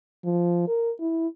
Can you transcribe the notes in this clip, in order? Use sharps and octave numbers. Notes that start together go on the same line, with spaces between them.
F3
A#4
E4